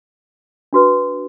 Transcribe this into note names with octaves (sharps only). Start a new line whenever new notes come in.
D4 F#4 B4